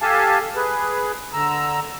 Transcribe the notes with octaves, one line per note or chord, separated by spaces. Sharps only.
G4 A4 F5 G#5 A5
G#4 B4
D3 A#5 E6